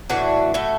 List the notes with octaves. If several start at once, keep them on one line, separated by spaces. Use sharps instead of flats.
A2 E3 D4 F#4
A2 A3 F#4 A4